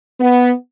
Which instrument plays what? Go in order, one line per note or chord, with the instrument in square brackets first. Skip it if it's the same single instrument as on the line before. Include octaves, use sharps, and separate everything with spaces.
[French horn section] B3